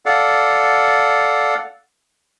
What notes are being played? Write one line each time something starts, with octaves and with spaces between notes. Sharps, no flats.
A4 D5 F5 F#5